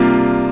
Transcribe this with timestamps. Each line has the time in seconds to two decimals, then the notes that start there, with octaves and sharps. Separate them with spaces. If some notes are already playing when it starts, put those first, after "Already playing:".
Already playing: C3 G3 A#3 D4 F4